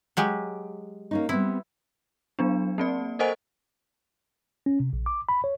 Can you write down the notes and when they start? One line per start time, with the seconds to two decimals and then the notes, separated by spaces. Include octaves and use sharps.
0.17 F#3 G#3 G4
1.11 A#3 C#4 D#4
1.29 G3 B3 C4 E4
2.39 F#3 B3 D4
2.78 A#3 C4 D5
3.19 A4 A#4 C5 D#5 F#5 G#5
4.66 C#4
4.80 C3
4.93 A#1
5.06 D6
5.29 B5
5.44 C#5